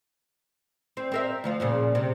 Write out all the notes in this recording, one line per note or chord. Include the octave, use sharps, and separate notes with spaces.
C4
C4 A#4 E5
D2 F3 F4
A#2 C#3 F3
C3